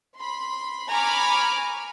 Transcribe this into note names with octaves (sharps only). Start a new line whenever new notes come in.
B5 C6
G#5 A#5 B5 C#6 D6 F6